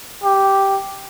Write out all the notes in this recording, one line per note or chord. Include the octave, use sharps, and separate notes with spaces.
G4